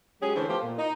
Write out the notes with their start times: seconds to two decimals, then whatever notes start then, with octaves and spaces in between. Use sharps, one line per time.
0.22 F#3 G#3 C#4 G4 G#4
0.36 D3 E3 A3 C#4 C5
0.49 F3 A3 B3 F4 G4 C5
0.63 A#2
0.78 D#4